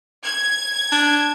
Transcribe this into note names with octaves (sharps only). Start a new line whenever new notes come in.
G#6
D4